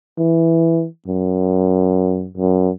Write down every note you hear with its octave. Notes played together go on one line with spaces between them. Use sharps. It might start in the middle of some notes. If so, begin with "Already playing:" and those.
E3
F#2
F#2